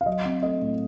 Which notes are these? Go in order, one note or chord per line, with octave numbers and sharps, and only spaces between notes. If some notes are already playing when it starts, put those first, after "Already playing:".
F5
F#3 D#5
C4
A3 D#5
A2